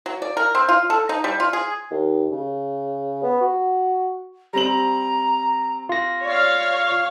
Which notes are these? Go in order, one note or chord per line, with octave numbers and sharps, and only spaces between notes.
F#3
D5
A#4
C4
F4
A4
D#4
G3
F4
G#4
D#2
C#3
B3
F#4
G3 C4 A#5 F#7
F4 A#6
C#5 D5 F5